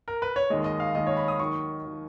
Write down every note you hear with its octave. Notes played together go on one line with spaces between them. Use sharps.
A#4
B4
C#5
D#2 D#3 G#3 D#5
D#5
F5
D#2 D#3 G#3 D#5
C#5
B5
D#6
D#2 D#3 F#3 C#6
D#3 F#3